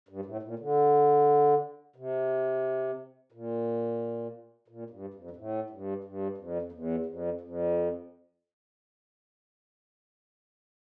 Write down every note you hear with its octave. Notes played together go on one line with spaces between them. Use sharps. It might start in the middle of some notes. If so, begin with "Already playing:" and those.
G2
A2
A#2
D3
C3
A#2
A#2
G2
F2
G2
A2
G2
G2
F2
F2
E2
F2
F2